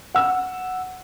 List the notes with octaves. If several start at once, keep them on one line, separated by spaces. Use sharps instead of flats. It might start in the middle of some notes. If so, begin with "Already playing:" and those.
F#5 E6